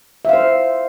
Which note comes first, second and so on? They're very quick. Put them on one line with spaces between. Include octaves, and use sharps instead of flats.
E5 F5 C5